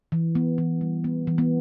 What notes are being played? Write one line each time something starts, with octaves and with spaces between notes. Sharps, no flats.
E3
B3
E3
G3
B3
E3
B3